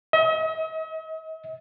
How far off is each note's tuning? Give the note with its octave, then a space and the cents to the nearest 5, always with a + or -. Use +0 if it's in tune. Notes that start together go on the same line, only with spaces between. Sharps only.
D#5 +45